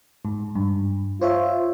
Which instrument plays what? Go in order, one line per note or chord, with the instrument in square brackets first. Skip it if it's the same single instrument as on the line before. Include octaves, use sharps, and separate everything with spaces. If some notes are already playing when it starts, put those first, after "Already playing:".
[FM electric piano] G#2
G2
[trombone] F4 [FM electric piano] C5 C#5 E5